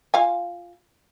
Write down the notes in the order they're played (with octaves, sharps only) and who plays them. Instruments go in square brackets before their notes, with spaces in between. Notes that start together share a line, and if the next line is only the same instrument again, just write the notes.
[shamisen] F4 F5 G#5